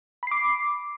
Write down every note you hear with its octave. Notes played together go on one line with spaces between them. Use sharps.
B5 D6 C7